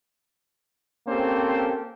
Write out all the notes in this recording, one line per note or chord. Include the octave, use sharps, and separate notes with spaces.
A#3 C4 C#4 G4 A4 C5